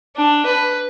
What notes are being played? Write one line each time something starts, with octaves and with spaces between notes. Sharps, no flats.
D4
B4